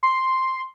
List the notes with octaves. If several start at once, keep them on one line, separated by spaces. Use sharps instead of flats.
C6